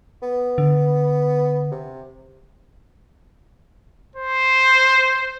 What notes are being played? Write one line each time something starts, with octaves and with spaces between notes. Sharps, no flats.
B3
D3
C3
C5